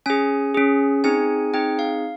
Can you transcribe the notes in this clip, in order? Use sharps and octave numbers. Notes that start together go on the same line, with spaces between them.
C#4 G#4 G#5
C#4 G#4
C4 D#4 G#4 G#5
C4 D#4 G#4 G5
F5